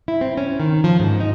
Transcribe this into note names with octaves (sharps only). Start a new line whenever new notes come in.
E4
C4
C#4
D#3
F3
G#2
D#4